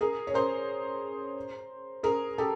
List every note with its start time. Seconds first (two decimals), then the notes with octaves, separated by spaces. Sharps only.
0.01 G#4 A#4
0.27 C#5
0.34 A#4 C5
2.03 G#4 A#4
2.38 G4 A4